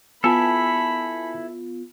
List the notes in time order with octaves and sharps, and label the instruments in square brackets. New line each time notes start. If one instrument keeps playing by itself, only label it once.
[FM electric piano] B3 F4 [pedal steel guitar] E4 A4 [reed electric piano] G#5 A5 E6 [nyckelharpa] B5